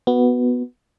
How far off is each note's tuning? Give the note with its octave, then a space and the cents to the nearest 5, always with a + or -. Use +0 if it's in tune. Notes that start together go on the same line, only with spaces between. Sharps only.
B3 +0 F#4 +0